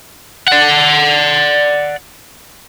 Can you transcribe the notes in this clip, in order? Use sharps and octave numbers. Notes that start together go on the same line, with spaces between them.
D5 F#5